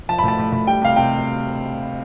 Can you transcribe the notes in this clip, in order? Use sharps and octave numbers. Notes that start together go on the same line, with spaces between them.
F3 A5
B5
A2 A5
A2
A2
G3 G5
C3 F5
C3 G5